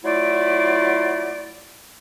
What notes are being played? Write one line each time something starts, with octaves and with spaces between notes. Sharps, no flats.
F#3 A3 E4 F4 D5